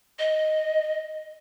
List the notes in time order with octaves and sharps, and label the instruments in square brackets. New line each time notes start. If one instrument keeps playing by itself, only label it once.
[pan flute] D#5